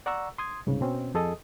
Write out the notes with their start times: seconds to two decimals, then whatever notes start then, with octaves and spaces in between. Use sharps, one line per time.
0.06 D5 F#5 A#5 C#6 E6
0.38 C6 D#6 G#6
0.67 C2 G#2 C#3
0.81 B2 C4 C#4
1.14 F2 G#4 A4 D#5 D#6